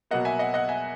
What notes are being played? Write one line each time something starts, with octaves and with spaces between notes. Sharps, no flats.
B2 F#3 A#3 D#5 F#5
E5 G#5
D#5 F#5
D#5 F#5
E5 G#5